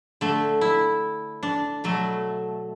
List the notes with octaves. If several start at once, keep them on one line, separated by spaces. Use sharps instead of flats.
D3 A3
E4
D4
B2 F#3 A3